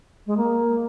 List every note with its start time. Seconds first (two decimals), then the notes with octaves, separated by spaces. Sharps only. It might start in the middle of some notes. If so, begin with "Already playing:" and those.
0.27 G#3
0.37 A#3